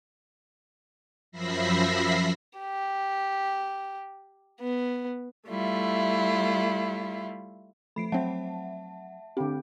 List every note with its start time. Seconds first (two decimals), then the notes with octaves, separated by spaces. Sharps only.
1.32 F#2 F3 E5 B5 A#6 C7
2.59 G4
4.60 B3
5.48 G3 A3 E4 F4
7.96 F3 A3 B5 C7 D7
8.12 F#3 C4 E5 F#5 A5
9.37 D3 C4 G4